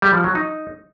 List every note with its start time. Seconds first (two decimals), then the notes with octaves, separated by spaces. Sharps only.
0.02 G3
0.13 F3
0.24 F#3
0.35 D#4